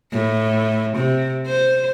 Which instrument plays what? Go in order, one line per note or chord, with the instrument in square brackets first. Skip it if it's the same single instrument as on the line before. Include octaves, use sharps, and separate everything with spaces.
[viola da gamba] A2
C3
C5